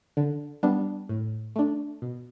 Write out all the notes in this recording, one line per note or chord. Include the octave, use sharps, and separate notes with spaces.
D3
G3 B3 D4
A2
A3 D4
B2